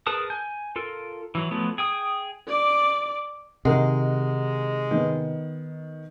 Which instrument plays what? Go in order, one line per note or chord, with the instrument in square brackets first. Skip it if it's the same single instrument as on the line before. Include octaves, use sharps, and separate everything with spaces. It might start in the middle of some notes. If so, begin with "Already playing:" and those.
[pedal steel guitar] G#4 A#4 B4 A5 D#6
G#5 G6
F4 A4 A#4
E3 F#3
F3 F#3 A3 B3
G#4 G5 D#6
[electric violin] D5 D6
[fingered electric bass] C3 [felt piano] D#3 A#4 F#5 [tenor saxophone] G#3
[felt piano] D#3 B3